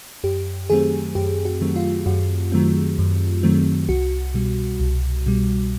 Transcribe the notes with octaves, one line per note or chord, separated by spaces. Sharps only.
F#2 G4
D#3 F#3 A3 C4 G#4
F#2 G4
F#4
D#3 F#3 A3 C4
F4
F#2 F#4
D#3 F#3 A3 C4
F#2
D#3 F#3 A3 C4
C2 F#4
B2 G3
C2
B2 G3